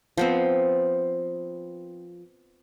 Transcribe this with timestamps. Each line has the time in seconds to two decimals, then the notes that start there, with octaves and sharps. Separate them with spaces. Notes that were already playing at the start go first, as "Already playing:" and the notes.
0.17 F3 B3 C4